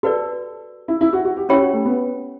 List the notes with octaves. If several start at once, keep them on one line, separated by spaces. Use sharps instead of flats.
F#4 A4 B4 D5
E4
E4
F#4
F#4
G4
C#4 E4 G4 C#5 G5 B5
F#4
A3
B3